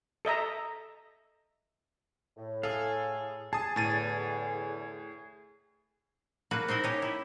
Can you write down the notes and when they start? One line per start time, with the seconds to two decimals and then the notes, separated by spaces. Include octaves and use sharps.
0.25 A4 D#5 E5 A#5
2.37 A2
2.63 G#4 A4 F5
3.53 G#4 A5 D#6
3.76 E2 A2 D3 A6 D#7
6.51 A#3 F#4 B4
6.68 C4 D#4 E4 D#5
6.84 C#4 D#4 G4
7.02 E4